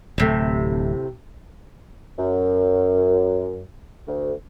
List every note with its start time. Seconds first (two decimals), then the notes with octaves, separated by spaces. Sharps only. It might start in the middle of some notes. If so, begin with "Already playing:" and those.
0.18 D1 A2 C3 A3
2.18 F#2
4.07 D2